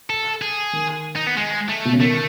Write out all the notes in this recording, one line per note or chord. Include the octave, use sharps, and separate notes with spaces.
A4
G#4
D#3
D#4
B3
G#3
A3
B2
C#3
D#3 A3